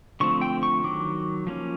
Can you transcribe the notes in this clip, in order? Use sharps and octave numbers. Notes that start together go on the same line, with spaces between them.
D3 F3 A3 C4 C#6
G5
C#6
D#3 F#3 D6
F3 A#3 C#4